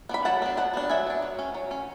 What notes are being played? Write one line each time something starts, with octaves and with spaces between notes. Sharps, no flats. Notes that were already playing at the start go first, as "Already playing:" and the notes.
B3 D4 B5
F#3 F#5 A5
B3 D4
F#3 F#5 A5
B3 D4
F#3 E5 G#5
B3 D4
F#3
C#4
F#3
C#4